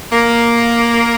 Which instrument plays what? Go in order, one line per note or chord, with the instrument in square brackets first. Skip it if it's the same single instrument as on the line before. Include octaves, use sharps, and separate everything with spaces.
[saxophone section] A#3